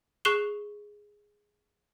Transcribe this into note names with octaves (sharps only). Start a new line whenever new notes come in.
G#4 C#6 F#6 C7 E7 G7